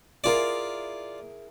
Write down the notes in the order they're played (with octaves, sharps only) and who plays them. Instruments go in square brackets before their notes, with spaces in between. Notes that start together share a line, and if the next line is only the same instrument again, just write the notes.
[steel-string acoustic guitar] E4 G#4 A#4 [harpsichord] F4 D5